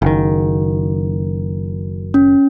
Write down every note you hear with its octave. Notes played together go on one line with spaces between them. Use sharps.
F#1 D#3
C#4